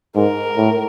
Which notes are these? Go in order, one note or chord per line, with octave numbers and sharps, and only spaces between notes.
G#2 A#4
A2